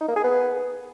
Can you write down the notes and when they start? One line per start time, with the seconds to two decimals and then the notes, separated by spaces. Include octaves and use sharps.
0.01 D#4
0.08 A#3
0.16 G#4
0.24 B3